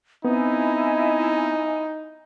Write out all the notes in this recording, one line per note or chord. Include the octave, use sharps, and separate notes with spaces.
B3 C4 D#4 E4 D#5 G#5